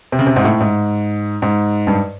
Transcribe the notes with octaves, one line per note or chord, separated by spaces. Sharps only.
C3
C#3
C3
G#2
A2
G#2
G#2
G2